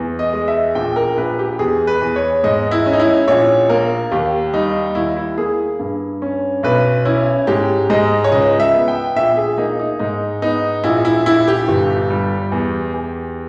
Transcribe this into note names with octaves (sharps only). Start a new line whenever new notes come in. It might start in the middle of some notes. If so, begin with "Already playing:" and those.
Already playing: E2
D#5
G#3
E5
A#1 G5
A#4
A#1 B4
G4
E2 G#4
B4
E2
C#5
G#2 D#5
E4
C#4
D#4
E4
A#1 C#5
A#3 A#4
D#2 G4
G3 D#4
D#2 E4
E4
A#3 G#4
G2
C#4
B1 B4
C#4 E4
G#2 G4
G#2 D#5
C#5
C#2 D#5
E5
B3
G5
A#1 E5
G#4
A#3 D#4
D#4
G#2 D#4
B3 D#4
A#1 E4
E4
A#1 E4
G4
G1
G3
E2
E2